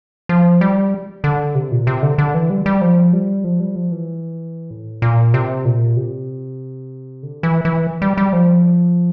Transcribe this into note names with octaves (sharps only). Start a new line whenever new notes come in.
F3
G3
D3
C3
A#2
C3
D3
D3
E3
G3
G3
F3
G3
F3
G3
F3
E3
A2
A#2
C3
A#2
C3
D3
E3
E3
G3
G3
F3